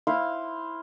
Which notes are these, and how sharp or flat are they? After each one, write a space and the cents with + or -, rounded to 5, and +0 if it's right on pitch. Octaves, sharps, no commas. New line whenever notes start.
E4 -5 C5 +0 F5 +0